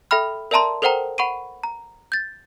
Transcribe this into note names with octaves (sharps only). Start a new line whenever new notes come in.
A4 E5 G5 B5 F6
A#4 D5 E5 A5 A#5 C6
A4 A#4 C5 F#5 G5 A#5
F#5 B5 C#6 C7 D7 D#7
A#5
G6 A6